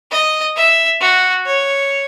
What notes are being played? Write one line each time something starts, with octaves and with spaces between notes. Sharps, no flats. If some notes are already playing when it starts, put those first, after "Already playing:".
D#5
E5
F#4
C#5